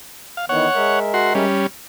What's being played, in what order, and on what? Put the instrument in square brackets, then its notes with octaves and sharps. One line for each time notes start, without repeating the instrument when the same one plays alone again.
[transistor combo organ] F5
[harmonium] D#3 E3 B3 [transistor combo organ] C#5 F#5
[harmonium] G#3 A#4 E5
[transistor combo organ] F#4 C6
G3 C#4